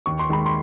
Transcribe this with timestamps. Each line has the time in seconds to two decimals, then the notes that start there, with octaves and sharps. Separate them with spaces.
0.06 D#2 C#6
0.19 C6
0.29 D#3 G#3 B5
0.46 C6